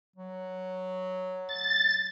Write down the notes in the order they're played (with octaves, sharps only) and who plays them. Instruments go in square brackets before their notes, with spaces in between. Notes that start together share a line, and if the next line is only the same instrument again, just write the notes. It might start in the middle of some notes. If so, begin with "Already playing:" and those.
[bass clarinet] F#3
[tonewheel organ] A6